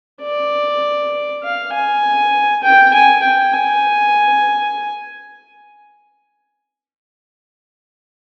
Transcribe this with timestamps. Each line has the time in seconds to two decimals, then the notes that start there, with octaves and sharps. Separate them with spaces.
0.23 D5
1.43 F5
1.73 G#5
2.63 G5
2.94 G#5
3.23 G5
3.54 G#5